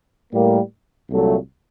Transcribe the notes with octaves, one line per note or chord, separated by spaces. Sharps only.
A2 G3 A#3
C2 A#2 F#3 A3